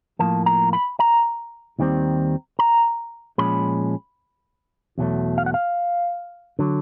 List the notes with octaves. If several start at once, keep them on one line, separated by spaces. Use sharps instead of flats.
A2 F3 A#3 A5
A#5
B5
A#5
D#2 D#3 G3 C4
A#5
A#2 F3 G#3 C#4 B5
E2 B2 F#3 A3
F5
F#5
F5
D3 F#3